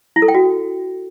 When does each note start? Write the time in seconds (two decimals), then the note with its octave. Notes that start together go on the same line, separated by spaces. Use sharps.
0.16 E4
0.22 A4
0.28 G5
0.35 F#4